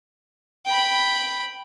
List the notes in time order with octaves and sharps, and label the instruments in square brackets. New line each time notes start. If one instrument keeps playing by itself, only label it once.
[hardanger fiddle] G5 B5